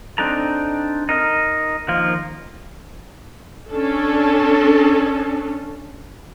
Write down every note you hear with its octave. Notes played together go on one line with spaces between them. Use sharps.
C4 D4 D#4 A4 A#5
D#4 A#4 D#5
D#3 F3 A#3 F4
C#4 D4 A4